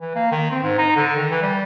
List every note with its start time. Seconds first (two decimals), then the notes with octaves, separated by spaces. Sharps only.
0.01 E3
0.15 A#3
0.31 D#3
0.51 C4
0.63 G#2
0.78 D#4
0.96 D3
1.17 D#3
1.31 E3
1.42 G3